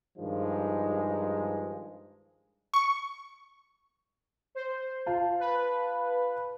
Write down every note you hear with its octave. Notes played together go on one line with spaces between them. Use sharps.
G2 D#3 F3 G#3 D#4
C#6
C5
F4 A5
B4